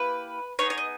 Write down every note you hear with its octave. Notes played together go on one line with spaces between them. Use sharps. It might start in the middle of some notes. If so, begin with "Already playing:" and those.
Already playing: A#3 E4 G4 B4
B3 D#4 G#4 C#5
C#5
D#5